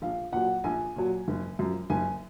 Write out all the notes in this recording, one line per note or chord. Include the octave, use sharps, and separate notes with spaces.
A#1 F5
A#2 F#3 F#5
A#1 G#5
A#2 F#3
F#1
F#2 F3
F#1 G#5